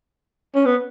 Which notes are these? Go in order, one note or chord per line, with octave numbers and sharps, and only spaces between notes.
C#4
B3